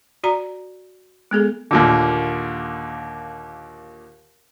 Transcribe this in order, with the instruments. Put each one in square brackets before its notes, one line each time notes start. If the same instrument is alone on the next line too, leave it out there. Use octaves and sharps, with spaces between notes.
[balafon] F#4 D5 A#5
G#3 B3 G#4 A4
[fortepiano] D#2 A#2 D3